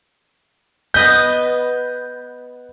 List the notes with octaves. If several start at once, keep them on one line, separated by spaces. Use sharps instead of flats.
B3 D#5 B5 G6